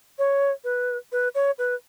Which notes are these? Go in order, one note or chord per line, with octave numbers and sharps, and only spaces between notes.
C#5
B4
B4
C#5
B4